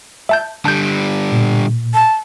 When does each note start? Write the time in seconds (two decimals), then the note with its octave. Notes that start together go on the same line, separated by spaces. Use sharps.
0.29 E5 A5 G6
0.65 D3 G3 A5 G6
1.32 A#2
1.94 A5